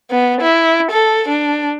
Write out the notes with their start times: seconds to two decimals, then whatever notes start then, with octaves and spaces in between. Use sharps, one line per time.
0.10 B3
0.41 E4
0.91 A4
1.28 D4